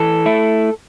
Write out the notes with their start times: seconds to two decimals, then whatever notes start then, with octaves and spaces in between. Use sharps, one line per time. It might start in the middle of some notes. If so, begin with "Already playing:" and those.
Already playing: E3 A4
0.26 A3 E4